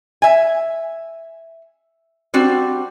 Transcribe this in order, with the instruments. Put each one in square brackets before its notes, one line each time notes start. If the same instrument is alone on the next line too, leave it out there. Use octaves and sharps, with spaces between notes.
[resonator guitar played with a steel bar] E5 G#5
G3 C4 D4 F#4